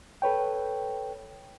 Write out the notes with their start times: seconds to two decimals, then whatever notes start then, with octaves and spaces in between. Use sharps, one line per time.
0.22 A4 B4 C#5 G5